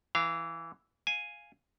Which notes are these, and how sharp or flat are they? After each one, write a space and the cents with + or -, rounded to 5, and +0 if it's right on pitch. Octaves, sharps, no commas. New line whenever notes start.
E3 +0 F5 -25 A#5 +0
F5 +0 G#5 +0